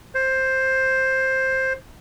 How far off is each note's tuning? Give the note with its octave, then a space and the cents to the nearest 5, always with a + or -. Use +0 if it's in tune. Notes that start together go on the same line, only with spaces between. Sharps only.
C5 +10